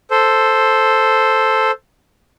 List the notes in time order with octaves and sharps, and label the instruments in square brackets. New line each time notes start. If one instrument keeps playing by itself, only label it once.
[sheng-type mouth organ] A4 C5